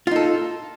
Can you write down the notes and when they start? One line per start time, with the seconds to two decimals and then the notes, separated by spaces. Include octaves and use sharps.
0.07 F4
0.11 D#4
0.16 A4